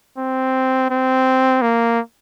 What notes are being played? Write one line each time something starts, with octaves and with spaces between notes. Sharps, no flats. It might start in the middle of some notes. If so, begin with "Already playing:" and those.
C4
C4
A#3